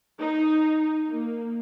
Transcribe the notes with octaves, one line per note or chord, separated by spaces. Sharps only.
D#4
A#3